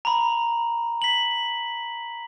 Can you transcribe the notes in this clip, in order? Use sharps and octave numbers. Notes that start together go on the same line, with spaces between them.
A#5 B5
B6 F#7